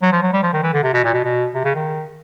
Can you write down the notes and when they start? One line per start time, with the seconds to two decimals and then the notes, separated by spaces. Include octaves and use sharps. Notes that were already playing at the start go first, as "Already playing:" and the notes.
0.02 F#3
0.12 F3
0.23 F#3
0.33 G3
0.43 F3
0.53 D#3
0.62 E3
0.73 D3
0.83 C3
0.93 B2
1.04 A#2
1.13 B2
1.24 B2
1.54 C3
1.64 C#3
1.76 D#3